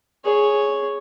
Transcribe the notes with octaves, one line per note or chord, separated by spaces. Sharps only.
G#4 C#5